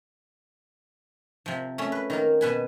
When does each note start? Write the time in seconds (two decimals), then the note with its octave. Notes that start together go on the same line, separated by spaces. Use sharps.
1.46 C3 F3
1.78 A3 C#4
1.92 B4
2.10 D#3 A#3 A#4
2.41 B2 B4 G#5